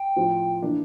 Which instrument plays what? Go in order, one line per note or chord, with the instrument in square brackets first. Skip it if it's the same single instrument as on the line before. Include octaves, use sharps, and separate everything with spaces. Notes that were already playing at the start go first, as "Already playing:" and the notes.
Already playing: [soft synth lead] G5
[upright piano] A2 F3 C4
E3 A#3 D4